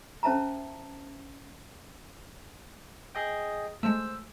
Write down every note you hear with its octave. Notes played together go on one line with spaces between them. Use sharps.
C#4 C5 E5 A5 A#5
G#4 D#5 G5
G#3 A3 C5 E6